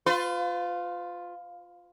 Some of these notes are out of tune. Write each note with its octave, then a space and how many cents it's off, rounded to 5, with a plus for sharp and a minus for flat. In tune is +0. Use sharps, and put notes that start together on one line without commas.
F4 +10 B4 +45